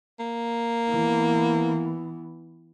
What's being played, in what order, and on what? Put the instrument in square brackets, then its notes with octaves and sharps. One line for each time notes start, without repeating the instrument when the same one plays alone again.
[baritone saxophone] A#3
[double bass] E3 B3